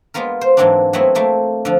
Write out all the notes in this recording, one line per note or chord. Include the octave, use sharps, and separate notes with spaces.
G#3 A#3 B3 F4 A#4
C5
G#2 E3 F#3 A#3 C4 D4
F#3 A3 B3 C4 E4 F#4
A3 A#3 C4
D3 F3